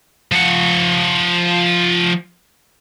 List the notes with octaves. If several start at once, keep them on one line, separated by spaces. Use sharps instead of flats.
F3 F#5